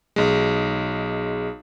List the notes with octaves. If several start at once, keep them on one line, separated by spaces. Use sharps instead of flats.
B1 G#3